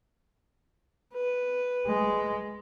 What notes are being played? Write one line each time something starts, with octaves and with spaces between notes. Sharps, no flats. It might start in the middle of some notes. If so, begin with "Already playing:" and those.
B4
G#3